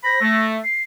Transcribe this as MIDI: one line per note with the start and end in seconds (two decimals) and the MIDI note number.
0.04 0.20 72
0.04 0.20 83
0.04 0.45 94
0.21 0.59 57
0.64 0.82 96